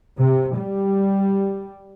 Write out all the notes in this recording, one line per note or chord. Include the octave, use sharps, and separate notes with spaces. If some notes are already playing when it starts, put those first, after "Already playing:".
C3
G3